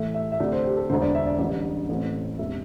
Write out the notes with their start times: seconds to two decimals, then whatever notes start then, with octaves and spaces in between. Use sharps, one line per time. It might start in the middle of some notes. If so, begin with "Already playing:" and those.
Already playing: A2 E3 A3 E5
0.14 E5
0.32 E5
0.40 D2 C3 A3 D4 D5
0.52 C5
0.64 G4
0.77 A4
0.89 E1 D2 D3 C5
1.02 D5
1.15 E5
1.26 D5
1.39 A1 G2 D3 D5
1.89 A1 A2 A3 C4
2.38 E1 C3 E5